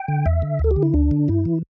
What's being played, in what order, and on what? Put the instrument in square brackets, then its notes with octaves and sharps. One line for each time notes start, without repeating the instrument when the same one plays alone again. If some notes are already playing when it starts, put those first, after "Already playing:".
Already playing: [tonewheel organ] G5
D3
E2 E5
D3
D2 A4
G4
D3
E4
D2 D4
D3
G2 E4
E3